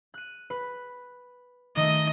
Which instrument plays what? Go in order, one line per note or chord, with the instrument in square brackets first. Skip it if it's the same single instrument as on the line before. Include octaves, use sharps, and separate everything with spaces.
[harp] F#6 D#7
B4
[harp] D#3 A3 [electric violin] D#5